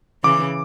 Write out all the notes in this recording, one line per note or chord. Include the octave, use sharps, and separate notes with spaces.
C#3 E3 D6